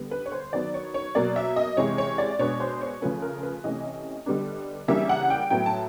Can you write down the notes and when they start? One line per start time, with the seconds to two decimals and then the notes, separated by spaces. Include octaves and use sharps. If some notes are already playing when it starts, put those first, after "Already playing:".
Already playing: D3 G3 B3
0.11 B4
0.26 C#5
0.32 C5
0.53 D#3 F#3 B3 D5
0.74 C#5
0.94 C#5
1.15 B2 F#3 A#3 D5
1.36 E5
1.56 D#5
1.77 C3 E3 G#3 C#5
1.98 C#5
2.18 D5
2.39 B2 G#3 B3 D4 C#5
2.60 C5
2.81 C#5
3.01 C#3 F3 A3 C#4 B4
3.22 A#4
3.43 B4
3.64 C3 E3 A3 C#4 D#5
4.26 D3 G3 B3 D4
4.88 C#3 E3 G3 A#3 D4 E5
5.09 F#5
5.30 G5
5.50 A2 F#3 B3 G5
5.66 A5